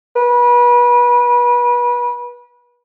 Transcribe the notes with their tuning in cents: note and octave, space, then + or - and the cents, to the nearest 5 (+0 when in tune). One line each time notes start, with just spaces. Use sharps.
B4 -30